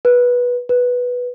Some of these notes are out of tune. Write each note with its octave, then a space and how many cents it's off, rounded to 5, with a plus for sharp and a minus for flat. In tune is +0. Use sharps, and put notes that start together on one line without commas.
B4 -15
B4 -5